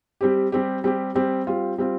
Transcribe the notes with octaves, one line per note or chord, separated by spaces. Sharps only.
G3 C4 G4
G3 C4 G4
G3 C4 G4
G3 C4 G4
G3 C4 F4
G3 C4 F4